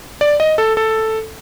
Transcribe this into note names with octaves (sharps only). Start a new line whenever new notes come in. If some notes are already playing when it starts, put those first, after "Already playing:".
D5
D#5
A4
A4